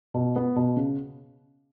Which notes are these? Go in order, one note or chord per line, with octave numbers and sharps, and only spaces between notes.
B2
B3
B2
C#3